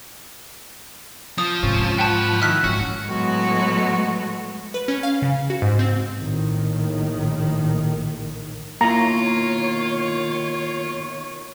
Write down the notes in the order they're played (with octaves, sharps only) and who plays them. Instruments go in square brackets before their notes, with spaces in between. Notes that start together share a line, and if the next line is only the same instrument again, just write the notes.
[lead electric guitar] F3 [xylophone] D#6
[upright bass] G#2 [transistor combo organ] C3 C#4
[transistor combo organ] F#5 B5 C#6 [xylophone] G5 A5
[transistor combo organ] D#3 E4 [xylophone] F6 F#6 B6
[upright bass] G#2 [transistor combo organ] C#4 [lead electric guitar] F#4
[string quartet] A2 F#3 G#3 A3 B3 F#4
[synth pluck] B4
C#4
F5
C#3
F#4
G#2
C4
[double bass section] A#1 A2 D#3
[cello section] B2 D#3 C#5 [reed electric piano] A#3 E4 [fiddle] F4 [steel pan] A#5